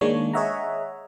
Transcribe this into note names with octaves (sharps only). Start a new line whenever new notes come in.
D#3 G#3 A#3 D4 C#5
G#4 C#5 D#5 E5 F#5 A#5